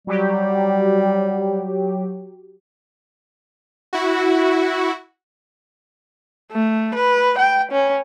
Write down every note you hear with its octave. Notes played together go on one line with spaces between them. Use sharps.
F#3 G3 G4
E4 F#4
A3
B4
G5
C#4